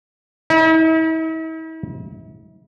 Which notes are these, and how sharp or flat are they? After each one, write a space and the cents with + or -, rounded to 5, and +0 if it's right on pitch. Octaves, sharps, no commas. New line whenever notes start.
E4 -45